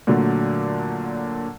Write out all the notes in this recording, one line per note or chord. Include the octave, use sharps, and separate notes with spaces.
A#2 D3 F#3 A3